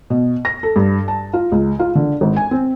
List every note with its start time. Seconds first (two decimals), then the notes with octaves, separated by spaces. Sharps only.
0.10 B2
0.45 A#6
0.63 A4
0.76 G2
1.08 A5
1.33 F4
1.52 C#2
1.79 F4
1.95 D3
2.21 G#1
2.36 G#5
2.51 C4